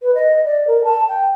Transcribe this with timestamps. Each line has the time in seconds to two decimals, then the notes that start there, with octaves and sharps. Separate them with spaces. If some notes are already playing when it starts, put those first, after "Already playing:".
0.02 B4
0.15 D#5
0.45 D5
0.67 A#4
0.85 A5
1.08 G5